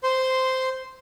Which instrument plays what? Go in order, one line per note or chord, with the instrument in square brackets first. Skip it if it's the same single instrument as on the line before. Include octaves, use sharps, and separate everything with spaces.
[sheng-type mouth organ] C5 C6